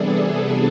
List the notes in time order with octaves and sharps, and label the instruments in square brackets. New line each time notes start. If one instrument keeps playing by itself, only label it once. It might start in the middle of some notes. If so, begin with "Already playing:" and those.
Already playing: [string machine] C3 E3 G3 B3 D4 G#4 A4